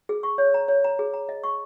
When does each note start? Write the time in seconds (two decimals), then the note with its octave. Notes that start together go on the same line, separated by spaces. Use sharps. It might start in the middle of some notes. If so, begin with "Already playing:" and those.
0.09 G#4
0.23 C#6
0.38 C#5
0.54 A#5
0.68 C#5
0.84 A#5
0.99 G#4
1.14 A#5
1.29 D#5
1.43 C#6